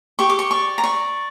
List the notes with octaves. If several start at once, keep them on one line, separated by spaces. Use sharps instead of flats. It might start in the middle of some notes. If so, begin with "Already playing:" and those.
G4 C#6
D6
C#6
D5 C#6
A#5
D5 C#6